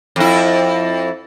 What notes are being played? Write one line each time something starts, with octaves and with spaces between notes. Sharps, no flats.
F2 E4